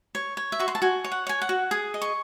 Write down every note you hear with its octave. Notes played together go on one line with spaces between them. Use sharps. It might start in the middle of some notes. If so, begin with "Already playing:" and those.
C#5
C#5
E5
F#4 C#6
C6
A5
F#4 G#5
C#5
F#5
C#5 G#5
F#5
F#4
G#4 D#6
D#5
C#6